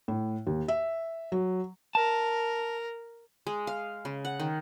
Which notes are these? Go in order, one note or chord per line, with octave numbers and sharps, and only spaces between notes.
A2
D#2
E5
F#3
A#4 A5
G#3
F5
C#3
F#5
D#3